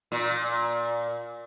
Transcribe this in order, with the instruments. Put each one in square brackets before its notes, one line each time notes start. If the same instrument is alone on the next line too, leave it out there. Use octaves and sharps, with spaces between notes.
[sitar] A#2